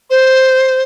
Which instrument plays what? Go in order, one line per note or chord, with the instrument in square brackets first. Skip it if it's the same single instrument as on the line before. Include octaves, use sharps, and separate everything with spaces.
[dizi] C5